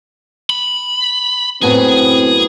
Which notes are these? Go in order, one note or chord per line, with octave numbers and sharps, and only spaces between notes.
B5
F#2 A2 B3 C4 G#4